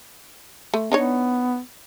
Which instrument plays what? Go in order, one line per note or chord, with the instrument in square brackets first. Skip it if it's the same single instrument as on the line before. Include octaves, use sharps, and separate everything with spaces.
[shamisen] A3
[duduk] B3 [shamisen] D4 D#4 C#5